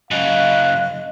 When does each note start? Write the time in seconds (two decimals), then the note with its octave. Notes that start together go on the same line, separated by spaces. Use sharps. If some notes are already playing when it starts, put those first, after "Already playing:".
0.11 F#2 C#3 D#5 F5 F#6